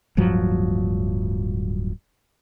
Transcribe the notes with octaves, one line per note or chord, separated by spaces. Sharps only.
D1 G2 F3 F#3